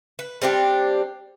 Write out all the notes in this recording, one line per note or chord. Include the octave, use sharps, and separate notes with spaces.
B4
G3 C4 D4 G4